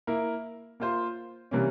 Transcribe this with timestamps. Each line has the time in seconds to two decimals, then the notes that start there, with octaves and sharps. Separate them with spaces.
0.07 A#3 E4 A#4
0.80 A#3 F4 C5
1.51 C3 E3 G3 A#3 C#4